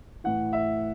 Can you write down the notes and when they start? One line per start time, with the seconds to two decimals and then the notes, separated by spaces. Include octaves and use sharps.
0.24 A2 E3 F#5
0.53 E5